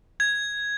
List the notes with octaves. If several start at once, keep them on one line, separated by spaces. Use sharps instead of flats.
G#6